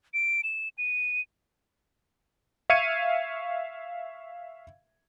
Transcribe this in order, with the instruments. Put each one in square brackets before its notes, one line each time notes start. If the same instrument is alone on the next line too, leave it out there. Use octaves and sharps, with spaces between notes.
[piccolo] D7
E7
D#7
[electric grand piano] E5 F5 C#6 G#6 C#7 D#7